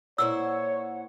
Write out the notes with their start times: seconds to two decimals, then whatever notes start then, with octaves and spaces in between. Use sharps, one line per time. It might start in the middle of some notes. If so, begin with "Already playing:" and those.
0.18 A#2 E4 C5 C#5 F#5 E6